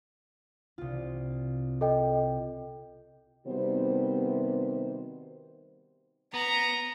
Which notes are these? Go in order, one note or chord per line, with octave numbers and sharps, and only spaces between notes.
C2 F4
A4 D#5 G5
C3 D#3 G3 B3 F#4 C5
B3 A#5